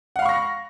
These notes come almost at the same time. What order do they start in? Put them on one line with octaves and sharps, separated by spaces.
F#5 F5 B5 C#6 A#6